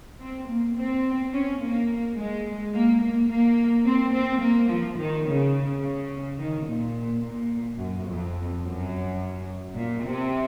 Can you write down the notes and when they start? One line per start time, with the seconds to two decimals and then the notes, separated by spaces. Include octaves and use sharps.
0.21 C4
0.48 A#3
0.76 C4
1.33 C#4
1.61 A#3
2.17 G#3
2.74 A#3
3.01 A#3
3.30 A#3
3.86 C4
4.13 C4
4.41 A#3
4.70 F3
4.98 D#3
5.26 C#3
5.82 C#3
6.38 D#3
6.66 A#2
7.22 A#2
7.78 F#2
8.07 F2
8.63 F#2
9.75 A#2
10.03 C3